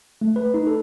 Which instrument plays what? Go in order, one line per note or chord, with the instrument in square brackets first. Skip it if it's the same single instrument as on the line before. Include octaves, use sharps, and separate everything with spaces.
[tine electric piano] A3
B4
D#4
A4